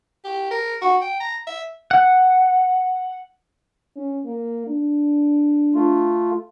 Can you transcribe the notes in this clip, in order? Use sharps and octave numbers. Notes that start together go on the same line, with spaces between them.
G4
A#4
F#4
G5
A#5
E5
F#5
C#4
A#3
D4
A3 F4